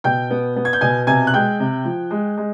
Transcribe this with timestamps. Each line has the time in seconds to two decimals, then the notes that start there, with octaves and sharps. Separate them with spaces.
0.04 B2 G5 G6
0.30 B3
0.56 B3
0.65 G#6
0.73 G6
0.81 B2 G#5 G#6
1.07 C3 G#5 G#6
1.27 F#6
1.34 G#3 G5 G6
1.60 C3
1.85 F3
2.11 G#3
2.38 G#3